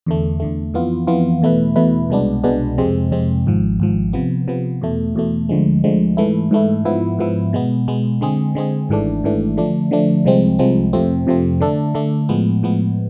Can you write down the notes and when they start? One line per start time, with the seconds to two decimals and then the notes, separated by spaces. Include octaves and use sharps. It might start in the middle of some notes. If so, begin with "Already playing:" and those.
0.06 E2 D3 A3
0.40 E2 D3 A3
0.74 F2 E3 B3 F4
1.07 F2 E3 B3 F4
1.41 E2 B2 A3 E4 B4
1.76 E2 B2 A3 E4 B4
2.10 C2 B2 G#3 B3 D4
2.44 C2 B2 G#3 B3 D4
2.78 F2 C3 G#3 C4
3.11 F2 C3 G#3 C4
3.46 G#1 G#2 F3
3.80 G#1 G#2 F3
4.13 C3 F3 B3
4.48 C3 F3 B3
4.82 E2 B2 A3
5.16 E2 B2 A3
5.49 D2 D3 F3 G#3
5.84 D2 D3 F3 G#3
6.17 G#2 E3 A3 E4
6.51 G#2 E3 A3 E4
6.85 G#2 F3 B3 E4
7.19 G#2 F3 B3 E4
7.53 B2 G#3 B3
7.88 B2 G#3 B3
8.21 D3 G#3 C4 G#4
8.55 D3 G#3 C4 G#4
8.89 G#1 G#2 E3 A3 D4
9.23 G#1 G#2 E3 A3 D4
9.57 D3 F3 A3 D4
9.91 D3 F3 A3 D4
10.25 C2 C3 F3 G#3 C4
10.59 C2 C3 F3 G#3 C4
10.93 F2 C3 F3 A3 C4
11.27 F2 C3 F3 A3 C4
11.60 D3 A3 D4 A4
11.95 D3 A3 D4 A4
12.29 A2 F3 G#3 B3
12.63 A2 F3 G#3 B3